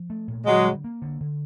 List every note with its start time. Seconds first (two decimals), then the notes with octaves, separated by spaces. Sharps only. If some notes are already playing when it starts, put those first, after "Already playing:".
Already playing: F3
0.10 A3
0.28 A#2
0.47 D3 F#3 G#3
0.65 G3
0.84 A#3
1.02 D3
1.21 D3